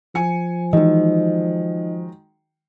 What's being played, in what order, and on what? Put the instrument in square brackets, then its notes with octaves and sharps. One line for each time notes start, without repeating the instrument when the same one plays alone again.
[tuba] F3 [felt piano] G#5 C#7
[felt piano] D#3 F#3 G#3 [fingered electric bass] E3 [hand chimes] D#4 D#5